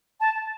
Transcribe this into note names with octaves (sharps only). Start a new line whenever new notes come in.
A5